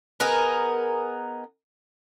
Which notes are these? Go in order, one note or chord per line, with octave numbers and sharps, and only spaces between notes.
B3 D#4 G#4 A#4